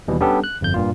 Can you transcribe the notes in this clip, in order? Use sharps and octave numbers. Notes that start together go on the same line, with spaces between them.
D#2 B2 E3 G3
G3 B3 C#4 D4 G4 A4
F#6
G1 F2 G6
G2 A#2 F4